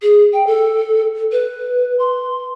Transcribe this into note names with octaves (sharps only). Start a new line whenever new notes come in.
G#4
G5
A4
B4
C6